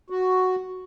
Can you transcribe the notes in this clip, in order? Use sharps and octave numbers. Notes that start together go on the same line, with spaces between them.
F#4